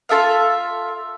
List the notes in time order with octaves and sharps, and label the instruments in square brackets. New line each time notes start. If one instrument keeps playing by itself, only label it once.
[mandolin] F4 A4 E5 F5